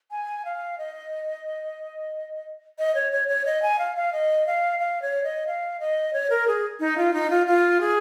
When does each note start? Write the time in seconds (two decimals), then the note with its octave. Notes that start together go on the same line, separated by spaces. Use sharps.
0.11 G#5
0.45 F5
0.78 D#5
2.79 D#5
2.95 C#5
3.12 C#5
3.28 C#5
3.45 D#5
3.62 G#5
3.79 F5
3.96 F5
4.13 D#5
4.47 F5
4.79 F5
5.02 C#5
5.24 D#5
5.47 F5
5.80 D#5
6.13 C#5
6.30 A#4
6.47 G#4
6.80 D#4
6.97 F4
7.13 D#4
7.30 F4
7.47 F4
7.80 G#4